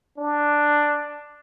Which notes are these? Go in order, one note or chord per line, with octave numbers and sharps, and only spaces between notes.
D4